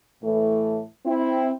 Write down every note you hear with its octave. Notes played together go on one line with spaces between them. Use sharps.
A2 E3 A3
C4 E4